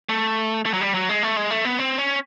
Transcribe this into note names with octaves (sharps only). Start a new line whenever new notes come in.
A3
A3
F#3
G3
F#3
G#3
A3
G#3
A3
B3
C4
C#4